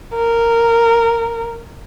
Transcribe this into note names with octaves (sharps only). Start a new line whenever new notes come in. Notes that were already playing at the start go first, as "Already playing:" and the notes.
A#4